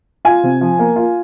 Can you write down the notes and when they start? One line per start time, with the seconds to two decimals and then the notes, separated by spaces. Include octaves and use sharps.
0.25 F4 G#5
0.43 C3
0.61 F3
0.79 A#3
0.96 F4